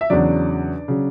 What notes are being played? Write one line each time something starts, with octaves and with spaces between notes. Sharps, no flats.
E5
E2 C#3 F#3 D4 D5
C#3 F#3